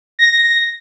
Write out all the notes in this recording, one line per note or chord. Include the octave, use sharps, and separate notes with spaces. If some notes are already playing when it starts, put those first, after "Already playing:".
A#6